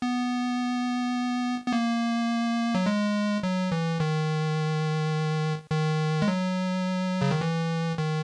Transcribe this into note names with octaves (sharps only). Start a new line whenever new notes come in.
B3
B3
A#3
F#3
G#3
F#3
E3
D#3
D#3
G#3
F#3
C#3
D#3
E3
D#3